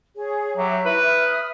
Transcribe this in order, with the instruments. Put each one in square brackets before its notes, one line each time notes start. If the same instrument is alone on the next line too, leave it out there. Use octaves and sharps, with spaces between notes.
[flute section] G#4 C#5
[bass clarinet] F#3 [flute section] G4 E5
[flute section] E4 [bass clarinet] B4
[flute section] E5 D#6 F6